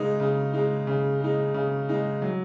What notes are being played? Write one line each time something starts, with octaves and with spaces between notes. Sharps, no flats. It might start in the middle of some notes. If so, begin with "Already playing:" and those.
Already playing: C#3 G#3 D#4
C#3
G#3 D#4
C#3
G#3 D#4
C#3
G#3 D#4
F#3